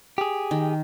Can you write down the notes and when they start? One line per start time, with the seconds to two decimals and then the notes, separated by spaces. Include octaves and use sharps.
0.18 G4 G#4
0.51 D#3